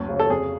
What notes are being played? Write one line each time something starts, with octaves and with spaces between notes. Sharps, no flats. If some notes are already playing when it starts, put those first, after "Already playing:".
Already playing: F#1 D2
C#3
A4
F1 G#4